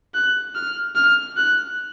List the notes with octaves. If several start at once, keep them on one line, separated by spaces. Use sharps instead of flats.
F#6
F6
F6
F#6